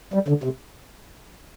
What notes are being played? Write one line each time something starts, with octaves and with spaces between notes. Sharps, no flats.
G3
D3
C3